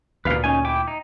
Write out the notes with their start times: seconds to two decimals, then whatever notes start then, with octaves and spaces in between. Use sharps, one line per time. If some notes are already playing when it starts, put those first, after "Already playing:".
0.25 D2 A#2 B4 F5
0.44 C#4 D#4 G#5
0.65 E4 G5 D6
0.88 D#4